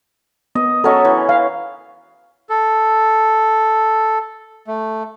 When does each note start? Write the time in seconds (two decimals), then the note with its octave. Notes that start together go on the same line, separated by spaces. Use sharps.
0.55 B3 D#5
0.84 F#3 C#4 A4 C#5 D#5
1.05 E3
1.29 F5
2.49 A4
4.67 A3